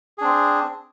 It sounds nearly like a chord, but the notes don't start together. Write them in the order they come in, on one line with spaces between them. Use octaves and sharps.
G#4 D4 C4